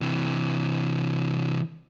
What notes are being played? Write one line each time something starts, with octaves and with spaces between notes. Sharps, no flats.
C3 E3